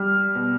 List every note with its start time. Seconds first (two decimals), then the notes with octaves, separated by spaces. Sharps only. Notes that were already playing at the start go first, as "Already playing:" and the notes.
Already playing: G3 F6
0.35 B2